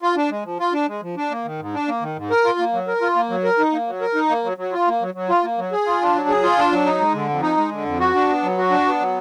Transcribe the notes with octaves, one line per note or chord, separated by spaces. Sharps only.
F4
D4
G#3
F3
F4
D4
G#3
F3
D4
A#3
D#3
G#2
D4
A#3
D#3
G#2
A#4
F4
A#3
F#3
A#4
F4
A#3
F#3
A#4
D#4
A#3
F#3
A#4
D#4
A#3
F#3
F#3
F4
A#3
F#3
F#3
F4
A#3
F#3
G#4
F4
D4
F#3
G#4
F4
D4
F#3
D#4
G#3
D3
F2
D#4
G#3
D3
F2
F#4
D4
B3
F#3
F#4
D4
B3
F#3